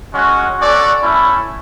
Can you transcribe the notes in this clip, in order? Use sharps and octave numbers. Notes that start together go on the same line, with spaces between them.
G#3 C#4 F#4
C#4 F#4 A4 D5 F#5
A3 C#4 E4